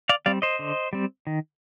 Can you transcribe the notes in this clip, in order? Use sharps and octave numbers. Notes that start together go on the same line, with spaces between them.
D5 F5
G3 C4 D5 F5
C5 D#5
D3
G3 C4
D#3